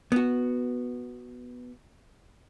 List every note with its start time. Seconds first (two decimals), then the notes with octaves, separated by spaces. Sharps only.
0.12 B3 F#4